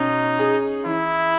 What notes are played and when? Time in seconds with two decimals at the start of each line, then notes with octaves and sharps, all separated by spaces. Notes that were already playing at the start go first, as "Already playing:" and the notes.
Already playing: B2 C#4 D#4
0.39 G#4
0.85 E3 E4